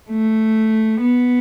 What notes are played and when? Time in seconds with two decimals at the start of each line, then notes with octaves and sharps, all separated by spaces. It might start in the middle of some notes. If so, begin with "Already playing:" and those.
0.11 A3
1.00 B3